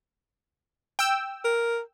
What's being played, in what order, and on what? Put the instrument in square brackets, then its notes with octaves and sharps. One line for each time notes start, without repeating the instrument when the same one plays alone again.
[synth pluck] G5 E6
[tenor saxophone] A#4